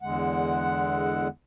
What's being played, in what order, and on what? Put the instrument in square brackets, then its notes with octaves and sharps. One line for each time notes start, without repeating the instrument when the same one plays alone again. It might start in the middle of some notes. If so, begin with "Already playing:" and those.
[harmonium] E2 D3 G#3 F#5